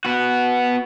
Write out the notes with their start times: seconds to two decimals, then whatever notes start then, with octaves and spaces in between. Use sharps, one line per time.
0.05 B3 F#4